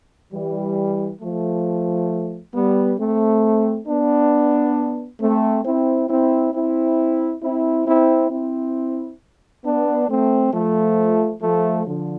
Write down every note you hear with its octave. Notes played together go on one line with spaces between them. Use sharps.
E3 G3
F3 A3
G3 B3
A3 C4
B3 D4
A3 C4
C4 E4
C4 E4
C4 E4
C4 E4
C4 E4
C4 E4
B3 D4
A3 C4
F3 A3
F3 A3
D3 F3